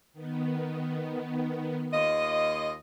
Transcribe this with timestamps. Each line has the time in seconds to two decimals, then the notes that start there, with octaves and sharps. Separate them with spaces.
0.13 D#3 B3
1.93 D#2 F4 D#5